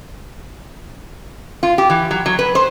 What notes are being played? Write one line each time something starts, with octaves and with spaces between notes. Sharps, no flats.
F4
G4
E3
F#3
F#3
B4
C5